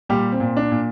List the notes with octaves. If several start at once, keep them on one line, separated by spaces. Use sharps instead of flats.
A#2 G3 G4
C4
A#2
D4
A#2